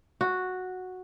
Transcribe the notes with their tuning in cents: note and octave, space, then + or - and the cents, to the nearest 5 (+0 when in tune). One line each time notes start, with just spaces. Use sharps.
F#4 -5